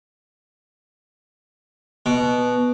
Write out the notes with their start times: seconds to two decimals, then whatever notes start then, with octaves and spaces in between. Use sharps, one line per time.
2.06 B2